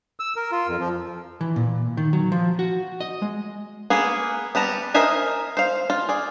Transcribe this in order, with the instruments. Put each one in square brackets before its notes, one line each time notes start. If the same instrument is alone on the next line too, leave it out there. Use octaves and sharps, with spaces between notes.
[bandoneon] E6
A#4
F4
F2
F3
[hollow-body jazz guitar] E3
A#2
D#3
F#3
F3
F#4
D#5
G#3
[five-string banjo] A#3 B3 G#4
G3 B3 A5 A#5
A#4 C5 D#5 E5 G#5
C5 F5
F4
G#4 D5